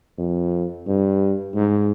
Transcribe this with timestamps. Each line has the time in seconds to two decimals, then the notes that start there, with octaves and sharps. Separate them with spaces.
0.18 F2
0.87 G2
1.55 G#2